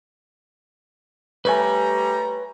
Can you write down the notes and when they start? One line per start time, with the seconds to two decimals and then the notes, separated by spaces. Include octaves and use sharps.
1.45 G3 A3 B4 C#5 G#5 A#5